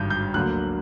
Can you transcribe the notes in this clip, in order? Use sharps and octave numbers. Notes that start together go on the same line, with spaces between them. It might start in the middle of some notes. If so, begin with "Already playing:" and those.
Already playing: G#1 G2 D3 G6
G6
D2 D3 F#3 A#3 F#6